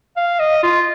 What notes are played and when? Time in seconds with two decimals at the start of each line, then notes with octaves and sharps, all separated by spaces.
0.16 F5
0.40 D#5
0.63 F4